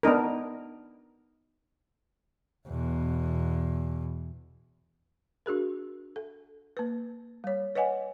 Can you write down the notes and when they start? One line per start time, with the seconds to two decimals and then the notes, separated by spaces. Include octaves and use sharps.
0.03 B3 D4 D#4 A#4
2.68 E2 B2
5.46 D4 F#4 G#4 A#4
6.16 A4
6.77 A#3 B4
7.44 G3 C#5
7.75 B4 C#5 D#5 F#5 G#5